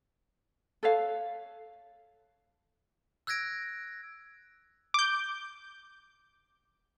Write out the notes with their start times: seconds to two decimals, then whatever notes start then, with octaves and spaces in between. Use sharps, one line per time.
0.83 A4 B4 C#5 F5
3.27 E6 F#6 G#6 A#6 D7
4.94 D6 G6